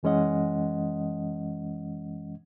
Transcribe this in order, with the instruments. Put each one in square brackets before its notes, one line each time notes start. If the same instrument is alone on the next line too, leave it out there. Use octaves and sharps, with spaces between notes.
[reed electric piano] F#2 E3 G#3 C#4 D#5 F#5